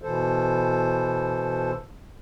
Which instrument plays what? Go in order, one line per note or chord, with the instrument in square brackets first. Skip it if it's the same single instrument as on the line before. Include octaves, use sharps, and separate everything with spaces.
[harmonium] B2 E3 A4 C5